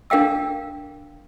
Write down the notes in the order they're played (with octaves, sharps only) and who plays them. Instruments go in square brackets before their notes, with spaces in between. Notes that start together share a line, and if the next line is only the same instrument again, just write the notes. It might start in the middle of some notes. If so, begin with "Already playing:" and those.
[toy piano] D4 A#4 F5 G5 E6